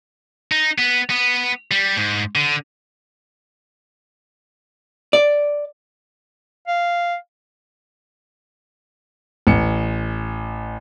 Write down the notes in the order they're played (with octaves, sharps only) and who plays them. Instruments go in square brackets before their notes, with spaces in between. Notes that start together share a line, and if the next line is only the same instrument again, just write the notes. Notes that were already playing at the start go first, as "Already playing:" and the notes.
[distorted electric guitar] D#4
B3
B3
G3
G#2
D3
[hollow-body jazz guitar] D5
[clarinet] F5
[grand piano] A1 C#7